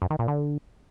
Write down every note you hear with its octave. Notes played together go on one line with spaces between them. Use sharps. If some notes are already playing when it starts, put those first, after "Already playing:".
F#2
D#3
A#2
D3